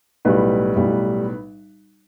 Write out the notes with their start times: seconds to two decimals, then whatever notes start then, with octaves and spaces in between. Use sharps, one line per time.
0.25 B1 A2 G3 B4
0.76 B1 A2 G3